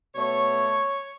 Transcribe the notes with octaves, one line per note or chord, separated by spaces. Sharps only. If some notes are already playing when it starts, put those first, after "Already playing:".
B2 A3 C#5